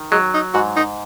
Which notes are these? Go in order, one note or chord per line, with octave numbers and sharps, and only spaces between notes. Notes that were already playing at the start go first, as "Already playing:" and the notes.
Already playing: D#3
F#3 G#3
D#4
G#2 F#4
D#4